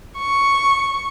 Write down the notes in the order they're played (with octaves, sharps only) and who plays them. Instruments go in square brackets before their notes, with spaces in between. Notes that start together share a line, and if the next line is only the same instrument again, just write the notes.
[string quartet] C#6